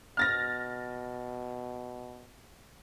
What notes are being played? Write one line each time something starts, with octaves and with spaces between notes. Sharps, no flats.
B2 F6 A6 A#6